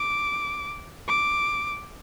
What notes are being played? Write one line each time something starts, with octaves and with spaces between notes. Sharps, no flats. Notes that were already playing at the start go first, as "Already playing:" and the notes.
Already playing: D6
D6